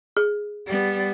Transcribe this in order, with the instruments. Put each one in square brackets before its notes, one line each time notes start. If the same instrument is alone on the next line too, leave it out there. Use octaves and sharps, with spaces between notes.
[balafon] G#4
[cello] G3 B3